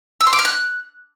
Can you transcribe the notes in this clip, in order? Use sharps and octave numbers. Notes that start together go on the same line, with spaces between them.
E6
C6
D6
F6
F#6